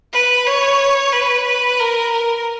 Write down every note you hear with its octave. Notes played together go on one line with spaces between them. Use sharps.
B4
C#5
B4
B4
A#4
A#4